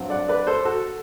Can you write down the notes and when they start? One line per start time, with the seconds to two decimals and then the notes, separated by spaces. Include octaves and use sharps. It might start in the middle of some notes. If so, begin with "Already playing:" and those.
Already playing: G2 F#3 C4
0.10 D5 F#5
0.29 B4 D5
0.47 A4 C5
0.65 F#4 A4